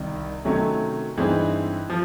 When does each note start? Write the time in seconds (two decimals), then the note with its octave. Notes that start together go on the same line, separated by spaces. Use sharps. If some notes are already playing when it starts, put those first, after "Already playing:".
Already playing: C2 C3 D#3
0.45 C3 D#3 F#3 A3 C#4
1.17 G2 E3 G#3 C4 D#4
1.90 F3